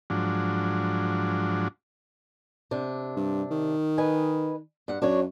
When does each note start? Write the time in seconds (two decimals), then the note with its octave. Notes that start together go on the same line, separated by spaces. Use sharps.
0.10 G#2 F3 F#3 D4
2.71 C3 D4
3.17 G2
3.51 D#3
3.98 B4 D#5 G#5
4.88 G2 F#5
5.02 F#2 D4 F#4 C#5